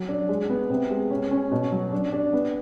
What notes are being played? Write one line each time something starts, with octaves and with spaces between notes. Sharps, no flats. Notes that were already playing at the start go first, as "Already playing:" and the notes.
Already playing: F#3
D4
G#3
B3
C3
G#3
C#4
C#4
B2
F#3
D4
D4
B3